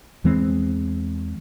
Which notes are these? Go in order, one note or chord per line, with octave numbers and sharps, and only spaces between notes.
E2 E3 G#3 C4